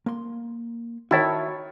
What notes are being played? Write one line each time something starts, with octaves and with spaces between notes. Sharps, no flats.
A#3 C6
D#3 E4 F#4 C#5 A5